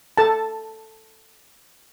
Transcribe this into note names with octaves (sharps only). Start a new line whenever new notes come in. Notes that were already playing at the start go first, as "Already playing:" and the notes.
A4 A5